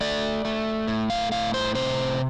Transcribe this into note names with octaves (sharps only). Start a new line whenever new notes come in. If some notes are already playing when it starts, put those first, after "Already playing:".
A3 D5
A3
A2
F5
A2 F5
C5
C3 C5